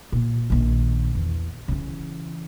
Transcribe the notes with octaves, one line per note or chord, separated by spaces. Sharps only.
A#2
A#1 D#3
E2
C#3 E3